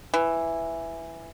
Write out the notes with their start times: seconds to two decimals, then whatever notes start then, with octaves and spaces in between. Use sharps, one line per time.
0.14 E3